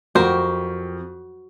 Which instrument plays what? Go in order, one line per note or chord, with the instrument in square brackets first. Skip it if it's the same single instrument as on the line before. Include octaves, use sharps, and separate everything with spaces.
[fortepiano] F2 [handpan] F#4 [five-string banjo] G4 A#4 C5